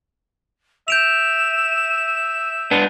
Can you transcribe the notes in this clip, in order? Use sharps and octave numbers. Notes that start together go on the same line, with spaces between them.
E5 G6 D7 E7 F7
D4 B4 F#5